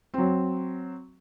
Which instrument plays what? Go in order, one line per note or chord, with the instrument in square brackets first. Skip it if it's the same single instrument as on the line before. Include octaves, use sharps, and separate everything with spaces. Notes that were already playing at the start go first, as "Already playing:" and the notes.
[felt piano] F#3 C4